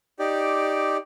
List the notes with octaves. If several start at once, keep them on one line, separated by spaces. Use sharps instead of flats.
D#4 G4 D5